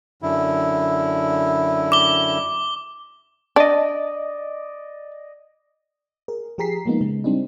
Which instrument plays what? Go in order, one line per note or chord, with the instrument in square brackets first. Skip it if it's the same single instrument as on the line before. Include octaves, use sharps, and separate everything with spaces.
[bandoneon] F#2 D3 E4
[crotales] D6 G7
[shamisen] D4 [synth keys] D5 D#5
[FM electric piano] G#4 A#4
F3 G4 G#4 A#5 B6 C7
F3 G#3 A#3 B3 D#4
C#3 G#3
G3 C4 D4 D#4